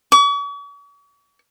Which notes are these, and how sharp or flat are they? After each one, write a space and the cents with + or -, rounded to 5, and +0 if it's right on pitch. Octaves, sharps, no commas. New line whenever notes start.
C#6 +45